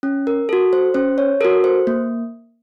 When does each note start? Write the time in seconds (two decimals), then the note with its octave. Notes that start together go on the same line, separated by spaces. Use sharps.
0.03 C#4
0.27 A#4
0.49 F#4 A4
0.73 C5
0.94 C#4 C5
1.18 C#5
1.41 A4 A#4
1.45 F#4
1.64 C5
1.87 A#3